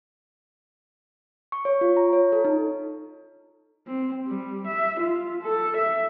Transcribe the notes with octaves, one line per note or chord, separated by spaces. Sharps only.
C#6
C#5
F4
A#5
C#5
A4
D#4
C4
G3
E5
F4
A4
E5